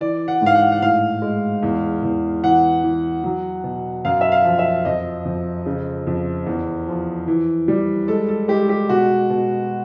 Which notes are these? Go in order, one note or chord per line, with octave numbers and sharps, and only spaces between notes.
E3 D5
F#5
G#2 F5
F#5
F#5
A2 F5
G#3
E2
E2
E3 F#5
E3
F#3
B2
F#2 F5
E5
F5
F3
E5
F2 D#5
F2
C#3
F2
E2
F3
E3
G3
G#3 A4
A4
G#3 G4
G4
B2 F#4
B2